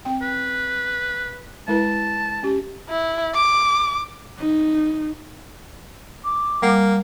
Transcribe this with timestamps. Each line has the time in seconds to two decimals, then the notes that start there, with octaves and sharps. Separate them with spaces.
0.05 C4 G5
0.22 B4
1.68 G#3 E4 B4 A5
2.43 C#4 G4
2.89 E4
3.35 D6
4.39 D#4
6.24 D6
6.62 G3 A#3 F#5